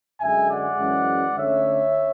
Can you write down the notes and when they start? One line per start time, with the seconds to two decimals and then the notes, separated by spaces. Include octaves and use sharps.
0.21 F#2 D3 G#3 E5 G#5
0.50 D5 F#5
0.79 F#2 E3 G#3 C#4
1.36 D3 A3 C#4 C#5 E5